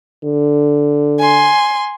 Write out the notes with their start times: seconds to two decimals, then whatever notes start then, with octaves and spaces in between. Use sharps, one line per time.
0.24 D3
1.19 G#5 C6